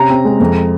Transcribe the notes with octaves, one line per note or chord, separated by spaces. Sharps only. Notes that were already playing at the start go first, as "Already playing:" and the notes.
Already playing: C3 C#4 A#5
C4
G#3
F2